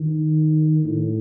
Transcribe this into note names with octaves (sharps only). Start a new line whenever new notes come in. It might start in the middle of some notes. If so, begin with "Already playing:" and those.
Already playing: D#3
A2